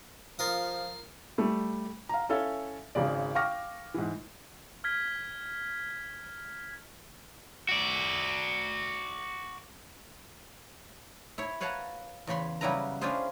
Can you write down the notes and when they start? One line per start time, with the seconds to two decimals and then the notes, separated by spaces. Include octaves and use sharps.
0.39 F3 F4 A#4 D#6
1.38 G3 A3
2.09 F5 A#5
2.29 C#4 E4 A4 C#5 E5 F5
2.95 G#1 C#3 G#3 D5
3.35 F5 G5 C#6 D6 F6 A#6
3.94 G#2 E3
4.84 F6 G#6 B6
7.69 F#4 D5
11.38 E4 C#5
11.60 B4 C#5 F5 F#5 A5 A#5
12.27 E2 C#3 C#5 B5 C6
12.61 C#3 F#3 G3 E4 B4 A#5
13.01 C#4 D4 E4 F4 G#4 C5